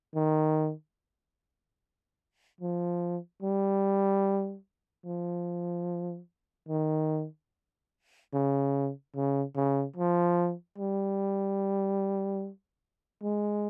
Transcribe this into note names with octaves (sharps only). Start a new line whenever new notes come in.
D#3
F3
G3
F3
D#3
C#3
C#3
C#3
F3
G3
G#3